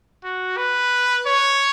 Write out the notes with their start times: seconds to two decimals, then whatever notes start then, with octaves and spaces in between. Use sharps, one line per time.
0.24 F#4
0.57 B4
1.26 C#5